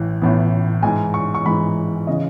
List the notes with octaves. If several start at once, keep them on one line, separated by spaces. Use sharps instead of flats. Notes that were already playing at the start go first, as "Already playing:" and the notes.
Already playing: A1 A2 E3
A1 A2 E3 B3
G#2 E3 G#3 G#5
C#6
C#6
G#2 E3 G#3 B5
C#3 E3 D#5